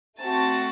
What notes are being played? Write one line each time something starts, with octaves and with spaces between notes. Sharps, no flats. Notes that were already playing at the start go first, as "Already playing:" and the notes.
A3 C4 F#4 A5